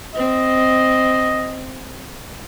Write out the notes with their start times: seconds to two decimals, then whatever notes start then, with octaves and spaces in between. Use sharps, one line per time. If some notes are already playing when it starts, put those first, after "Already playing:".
0.15 C4 D#5